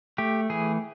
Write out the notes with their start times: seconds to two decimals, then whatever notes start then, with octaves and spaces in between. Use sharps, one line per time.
0.18 A3 G4
0.50 E3 G#4